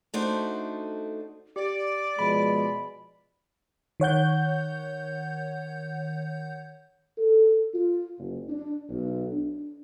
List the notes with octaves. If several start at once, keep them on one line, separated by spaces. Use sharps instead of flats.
A3 D4 D#4 F#4 A4 C5
G4 D5
B2 F3 G#3 B5
D#3 C#5 F#5 G6
A4
F4
F#1
D4
B1
D4